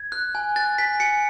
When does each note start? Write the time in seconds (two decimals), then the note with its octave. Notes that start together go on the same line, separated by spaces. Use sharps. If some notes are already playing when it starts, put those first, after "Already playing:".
Already playing: G#6
0.12 F#6
0.35 G#5
0.56 F#6 A6
0.78 G#5 B6
1.00 G#5 C#7